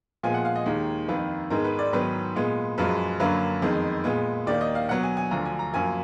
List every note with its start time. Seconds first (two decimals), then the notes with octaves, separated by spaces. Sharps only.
0.23 A#2 F3 G#3 B3 G#5
0.34 F#5
0.45 F5
0.56 D#5
0.66 D#2 D#3 G#3
1.08 F2 D#3 A#3 B4
1.50 G#2 D#3 G#3 B3 A#4
1.64 B4
1.79 D5
1.93 G#2 D#3 F#3 B3 B4
2.36 A#2 G#3 B3
2.78 F#2 F3 G#3 B4
3.20 F#2 D3 F#3 A#3 B4
3.62 F2 D#3 G#3 B3
4.04 A#2 G#3 B3
4.47 D#2 D#3 A#3 D5
4.61 D#5
4.75 F5
4.89 B2 F#3 B3 F#5
5.03 G#5
5.17 G#5
5.31 D2 D3 F3 A#5
5.45 G#5
5.59 A#5
5.73 F#2 F3 A#3 G#5